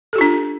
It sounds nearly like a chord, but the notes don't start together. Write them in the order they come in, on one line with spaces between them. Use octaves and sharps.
A4 G4 F4 D4